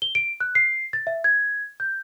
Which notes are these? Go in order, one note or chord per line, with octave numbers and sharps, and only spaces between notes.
G7
D7
F#6
C7
A6
E5
G#6
G6